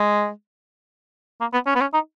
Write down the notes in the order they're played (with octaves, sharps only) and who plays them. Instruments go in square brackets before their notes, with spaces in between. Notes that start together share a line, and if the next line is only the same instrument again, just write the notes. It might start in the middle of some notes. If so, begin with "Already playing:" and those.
Already playing: [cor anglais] G#3
A#3
B3
C#4
B3
C#4
D#4